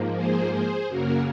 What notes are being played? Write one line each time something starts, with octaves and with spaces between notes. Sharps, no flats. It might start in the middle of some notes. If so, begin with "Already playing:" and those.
Already playing: G#2 F3 A#3
G#4 C5
G#4 C5
F#2 C#3 F#3 A#3 F#4 A#4